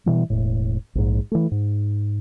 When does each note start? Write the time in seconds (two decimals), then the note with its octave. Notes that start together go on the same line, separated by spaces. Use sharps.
0.06 B2 E3 G3
0.30 E1 A2
0.95 A#1 G#2
1.32 E3 A3
1.51 G#2